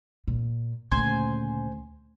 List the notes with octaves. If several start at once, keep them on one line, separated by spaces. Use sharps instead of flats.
A#2
D2 A#2 C#3 C5 G#5